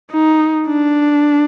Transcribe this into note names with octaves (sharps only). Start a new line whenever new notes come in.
D#4
D4